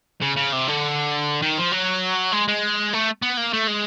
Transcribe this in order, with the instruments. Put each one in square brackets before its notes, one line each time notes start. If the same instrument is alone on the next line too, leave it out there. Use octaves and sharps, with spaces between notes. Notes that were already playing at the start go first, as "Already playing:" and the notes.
[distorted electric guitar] C#3
C#3
C3
D3
D#3
F3
F#3
G#3
G#3
A3
B3
A#3
A3
G#3